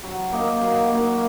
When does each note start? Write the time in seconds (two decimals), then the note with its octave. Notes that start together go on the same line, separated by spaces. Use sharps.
0.04 F#3
0.32 A#3 D#4
0.61 F#3
0.90 A#3 D#4